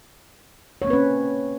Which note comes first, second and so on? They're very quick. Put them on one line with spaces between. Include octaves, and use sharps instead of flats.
C#5 A#3 C4 B4 C#4